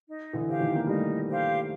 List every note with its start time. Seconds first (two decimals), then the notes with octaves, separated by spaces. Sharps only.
0.07 D#4
0.33 D3 E3
0.47 G4 C5 F5
0.60 D#3 F3
0.76 A#3
0.87 G3 A3 D#4
1.27 G4 C5 F5